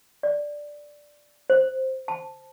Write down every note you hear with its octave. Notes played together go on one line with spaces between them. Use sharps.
D5
C5
A5